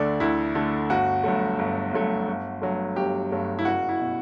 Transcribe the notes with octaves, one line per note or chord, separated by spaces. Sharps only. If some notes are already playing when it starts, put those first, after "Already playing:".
Already playing: D2 D3 A3 D5
D2 E4
D3 A3
G1 F#4
G2 F#3 A3
G1
G2 F#3 A3
G1
G2 F#3 A3
G1 G4
G2 F#3 A3
E4
F#1 F#4
E4
B2